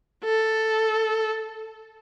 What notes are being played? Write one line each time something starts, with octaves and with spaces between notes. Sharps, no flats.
A4